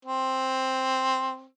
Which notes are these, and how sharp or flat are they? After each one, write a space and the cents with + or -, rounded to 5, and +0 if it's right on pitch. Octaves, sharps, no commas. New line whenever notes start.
C4 +5